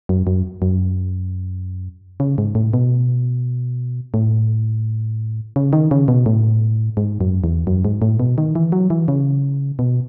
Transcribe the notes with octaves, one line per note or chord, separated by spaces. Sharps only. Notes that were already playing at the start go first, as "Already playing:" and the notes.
F#2
F#2
F#2
C#3
G#2
A2
B2
A2
C#3
D#3
C#3
B2
A2
G#2
F#2
E2
F#2
G#2
A2
B2
D#3
E3
F#3
E3
C#3
B2